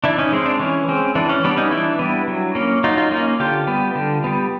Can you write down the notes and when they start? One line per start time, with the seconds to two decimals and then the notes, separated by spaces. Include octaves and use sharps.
0.04 E3 D4 E4
0.18 C#4 D#4
0.33 G#3 C4
0.46 D4
0.60 E3 C#4
0.88 G#3 C4
1.15 E3 D4
1.29 C#4
1.44 G3 B3 D4
1.57 C#4 D#4
1.71 E3 D4 E4
1.99 G3 B3
2.28 F#3
2.55 A#3 C#4
2.84 F#3 D#4 F4
2.97 D#4 F4
3.11 A#3 C#4 D#4 F4
3.40 D3 F4 G4
3.67 G3 B3
3.95 D3
4.24 G3 B3